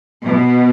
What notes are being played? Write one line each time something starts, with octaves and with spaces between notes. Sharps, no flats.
B2